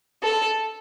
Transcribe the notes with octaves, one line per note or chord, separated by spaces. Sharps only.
A4